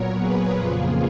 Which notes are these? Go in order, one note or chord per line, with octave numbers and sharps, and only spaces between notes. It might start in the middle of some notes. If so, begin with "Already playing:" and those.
Already playing: A#2 F#3 B3 A#4 C#5
G#4 B4
F2 C#3 F3 A#3 F4 G#4